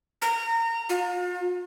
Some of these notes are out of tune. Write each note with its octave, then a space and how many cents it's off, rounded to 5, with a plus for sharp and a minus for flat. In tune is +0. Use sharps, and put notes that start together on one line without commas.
A#5 -25
F4 +40